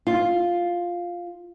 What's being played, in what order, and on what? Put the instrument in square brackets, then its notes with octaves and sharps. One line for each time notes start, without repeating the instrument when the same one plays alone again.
[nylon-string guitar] F4